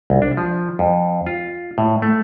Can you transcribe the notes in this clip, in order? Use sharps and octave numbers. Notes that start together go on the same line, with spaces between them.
C2
D4
F3
F2
F4
A2
A3